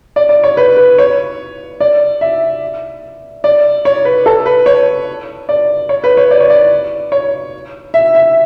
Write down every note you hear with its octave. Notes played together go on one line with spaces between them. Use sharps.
D5
D5
C#5
B4
B4
C#5
D5
E5
D5
C#5
B4
A4
B4
C#5
D5
C#5
B4
C#5
D5
C#5
D5
C#5
E5
E5